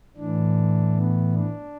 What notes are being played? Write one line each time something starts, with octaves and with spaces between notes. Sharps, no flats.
A2 E3 D4
B3
D4